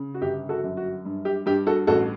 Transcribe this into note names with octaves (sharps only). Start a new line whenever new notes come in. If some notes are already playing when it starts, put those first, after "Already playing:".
Already playing: C#3
F#4
G1 G4
F#4 A4
F#2
F#4
G2
G4
G2 G4
F#4 A4
A1 F#4 A4